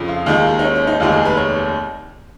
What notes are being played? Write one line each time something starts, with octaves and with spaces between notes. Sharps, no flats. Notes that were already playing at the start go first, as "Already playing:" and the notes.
Already playing: F2 C#3 F3
F4
D#2 D#3 G#3 F4
D#4
C#4
C#4
D#4
F1 D#2 D#3 G#3 F4
G#4
B4
C#5